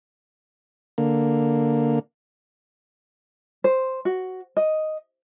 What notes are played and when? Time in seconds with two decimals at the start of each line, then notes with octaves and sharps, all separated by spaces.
0.98 D3 A#3
3.64 C5
4.05 F#4
4.57 D#5